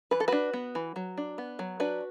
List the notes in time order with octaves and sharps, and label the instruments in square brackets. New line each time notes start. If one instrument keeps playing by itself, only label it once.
[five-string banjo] E3 B4
A4
D4 F#4 B4
B3
E3
F#3
D4
B3
F#3
D4 F#4 B4